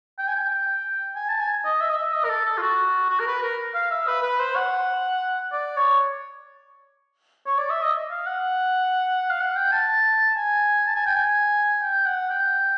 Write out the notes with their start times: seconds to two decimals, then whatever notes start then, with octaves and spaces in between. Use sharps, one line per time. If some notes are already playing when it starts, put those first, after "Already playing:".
0.19 G5
0.28 G#5
0.35 G5
1.16 G#5
1.29 A5
1.40 G#5
1.65 D#5
1.81 E5
1.89 D#5
1.97 E5
2.13 D#5
2.24 A#4
2.30 A4
2.45 A4
2.58 F4
2.62 F#4
3.09 F#4
3.20 A#4
3.27 B4
3.42 A#4
3.75 F5
3.91 E5
4.08 B4
4.23 B4
4.40 C5
4.56 F#5
5.53 D5
5.77 C#5
7.46 C#5
7.58 D5
7.70 E5
7.82 D#5
8.11 F5
8.26 F#5
9.30 F5
9.41 F#5
9.57 G5
9.72 A5
10.37 G#5
10.86 A5
10.96 G#5
11.06 G5
11.16 G#5
11.82 G5
12.06 F#5
12.30 G5